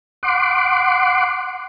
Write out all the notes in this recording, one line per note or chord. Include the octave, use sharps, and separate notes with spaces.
F#5 C6 D6